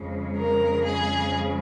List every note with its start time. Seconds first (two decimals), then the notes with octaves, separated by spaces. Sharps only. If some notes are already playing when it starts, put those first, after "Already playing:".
Already playing: F2 C#3 G#3
0.37 A#4
0.85 G#4